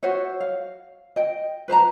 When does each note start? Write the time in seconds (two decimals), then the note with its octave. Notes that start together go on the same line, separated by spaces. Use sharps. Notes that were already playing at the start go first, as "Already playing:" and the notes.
0.03 F#4 C5 C#5 E5
0.40 F5
1.16 D#5 G5
1.68 B4 C5 A5 A#5